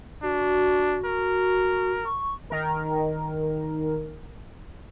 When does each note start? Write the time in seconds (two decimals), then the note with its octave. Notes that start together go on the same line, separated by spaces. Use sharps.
0.23 D4 F#4
1.05 A#4
2.05 C#6
2.50 D#3 A#4